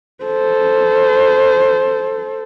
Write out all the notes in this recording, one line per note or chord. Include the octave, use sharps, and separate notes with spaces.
A4 C5